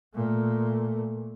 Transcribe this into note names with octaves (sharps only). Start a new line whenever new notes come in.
A#2 A3